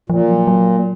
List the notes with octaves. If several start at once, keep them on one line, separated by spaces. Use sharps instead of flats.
A#2 F3
F#3
F#3